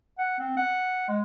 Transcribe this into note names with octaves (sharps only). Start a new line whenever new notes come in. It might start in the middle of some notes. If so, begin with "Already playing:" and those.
F#5
C4
F#5
G#3